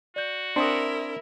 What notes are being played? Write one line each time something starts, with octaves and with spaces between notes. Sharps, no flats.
F#4 D5 G6
C4 D4 E4 A#4 C6 D#6